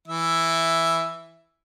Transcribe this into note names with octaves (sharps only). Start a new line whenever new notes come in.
E3 E5